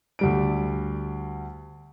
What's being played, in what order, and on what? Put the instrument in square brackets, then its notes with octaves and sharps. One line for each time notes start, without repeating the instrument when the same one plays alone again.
[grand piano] D2 G3 D7